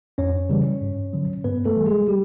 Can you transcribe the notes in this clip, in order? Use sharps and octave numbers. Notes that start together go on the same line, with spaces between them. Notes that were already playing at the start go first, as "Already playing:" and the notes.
F2 C#4 C#5
C#3 E3 G3
G2
D3 F#3
G2 B3 B4
A3 A4
E3 G3
G#3 G#4
G3 G4